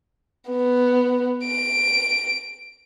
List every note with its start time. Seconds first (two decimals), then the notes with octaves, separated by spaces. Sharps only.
0.50 B3
1.46 D7